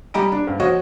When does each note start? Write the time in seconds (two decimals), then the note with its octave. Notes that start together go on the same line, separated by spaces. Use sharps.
0.14 G3 G4 D#5 A#5 D7
0.32 D4
0.47 G2
0.60 F3 F4 F#4 C#5 D#5